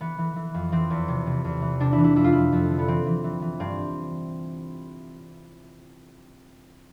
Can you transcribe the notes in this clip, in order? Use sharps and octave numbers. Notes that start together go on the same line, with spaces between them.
E3 B3
E3
E3
F2
E3 C4
E2
C3
C3
E2
E3
C3 D4
E4
E3
E4
F2 E4
F4
F2 E4
F2
D3
B3
E3 C4
E3
E3
E3
G2 C4